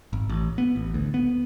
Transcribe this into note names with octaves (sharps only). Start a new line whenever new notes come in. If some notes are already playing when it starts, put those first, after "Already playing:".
G#1
A1
B3
A1
D2
B3